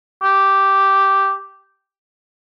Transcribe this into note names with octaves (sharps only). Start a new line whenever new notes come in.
G4